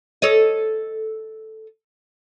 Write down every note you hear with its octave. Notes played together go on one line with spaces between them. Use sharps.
A4 C#5 D#5